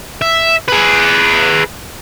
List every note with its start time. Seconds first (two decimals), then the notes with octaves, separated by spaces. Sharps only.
0.22 E5
0.68 G#4 B4